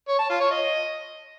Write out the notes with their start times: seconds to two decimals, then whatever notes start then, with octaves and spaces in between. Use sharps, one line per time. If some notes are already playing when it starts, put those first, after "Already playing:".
0.08 C#5
0.19 A5
0.30 F4
0.40 C#5
0.51 D#5